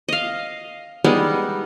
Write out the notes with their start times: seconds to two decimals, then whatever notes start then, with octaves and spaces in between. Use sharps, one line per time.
0.08 D#5 F5
1.04 G3 G#3 B3 D#4